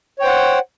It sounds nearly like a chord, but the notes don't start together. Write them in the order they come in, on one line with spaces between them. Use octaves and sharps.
C#5 G5 C5 F#5